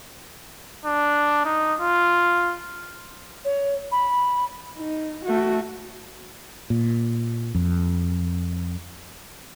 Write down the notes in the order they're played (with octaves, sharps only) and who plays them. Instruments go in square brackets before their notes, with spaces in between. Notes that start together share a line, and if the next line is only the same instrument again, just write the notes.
[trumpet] D4
D#4
F4
[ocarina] C#5
B5
[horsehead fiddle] D#4
A3 F#4
[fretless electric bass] A#2
F2